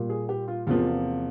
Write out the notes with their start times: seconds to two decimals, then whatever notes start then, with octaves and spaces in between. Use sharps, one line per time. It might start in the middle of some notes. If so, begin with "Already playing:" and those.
Already playing: A#2 G3 A#3
0.10 G#4
0.29 G4
0.48 F4
0.67 E2 C3 F3 A#3 F4